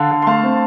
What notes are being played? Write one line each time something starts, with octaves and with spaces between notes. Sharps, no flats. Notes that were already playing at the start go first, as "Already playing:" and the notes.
Already playing: D3 F5 A5
D3
C6
A3 F5 A5
C4